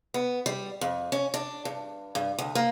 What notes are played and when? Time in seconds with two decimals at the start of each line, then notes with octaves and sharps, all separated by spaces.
0.14 B3
0.46 G3
0.81 F2
1.12 C#4
1.34 D4
1.65 G2
2.15 G2
2.39 D2
2.55 A#3